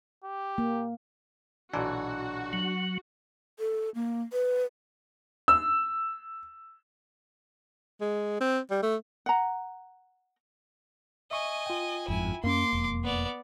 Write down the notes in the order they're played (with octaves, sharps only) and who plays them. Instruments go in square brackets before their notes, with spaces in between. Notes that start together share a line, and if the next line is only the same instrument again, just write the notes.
[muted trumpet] G4
[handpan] A#3
[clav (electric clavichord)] B1 A#2 E3 [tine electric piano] D4 [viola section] F#4
[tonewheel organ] F#3
[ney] A4
A#3
B4
[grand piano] E6
[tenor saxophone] G#3
C4
G3
A3
[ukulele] F#5 A#5
[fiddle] D#5 G#5 [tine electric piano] E5 C#6
[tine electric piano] F4 G5
[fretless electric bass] G1 F2 G#2 [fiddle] E4 G#5
[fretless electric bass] F#2 C#4 [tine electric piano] A#3 [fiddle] C6 D6
[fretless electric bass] E1 F2
[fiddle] B3 D5